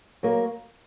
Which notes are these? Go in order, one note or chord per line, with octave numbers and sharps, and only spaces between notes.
F#3 A#3